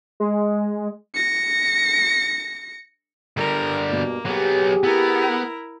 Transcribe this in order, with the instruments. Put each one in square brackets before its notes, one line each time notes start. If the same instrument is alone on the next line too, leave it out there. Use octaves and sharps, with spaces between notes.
[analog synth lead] G#3
[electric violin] A#6 C#7
[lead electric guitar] D3 G3 [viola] A#4
[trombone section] G2 B2 [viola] A#3
[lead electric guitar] F#3 B3 [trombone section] G4 G#4
[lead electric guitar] B3 [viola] E4 A#4